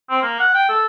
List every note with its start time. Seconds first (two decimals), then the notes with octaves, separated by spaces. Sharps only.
0.10 C4
0.22 A#3
0.39 F#5
0.54 G5
0.69 A4